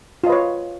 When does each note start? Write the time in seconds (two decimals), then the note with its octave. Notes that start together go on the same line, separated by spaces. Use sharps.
0.24 F4
0.26 D#5
0.29 B4
0.32 C#5